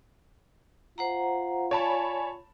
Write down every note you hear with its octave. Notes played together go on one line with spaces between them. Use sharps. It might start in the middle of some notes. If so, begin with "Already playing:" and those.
F4 C5 F#5 A#5
C#5 D5 G#5 A5 B5